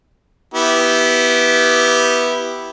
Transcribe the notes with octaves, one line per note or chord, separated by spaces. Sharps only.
B3 E4 G4